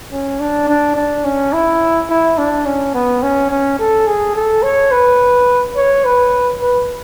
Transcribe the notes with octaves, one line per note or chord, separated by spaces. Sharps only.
C#4
D4
D4
D4
C#4
E4
E4
D4
C#4
B3
C#4
C#4
A4
G#4
A4
C#5
B4
C#5
B4
B4